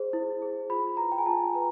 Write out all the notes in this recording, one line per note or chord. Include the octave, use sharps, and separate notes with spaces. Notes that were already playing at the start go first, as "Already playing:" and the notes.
Already playing: G#4 C5
E4
G#4 C5
F4 B5
G#4 B4 A#5
G5
G#5
F4 A5
G#4 B4 A#5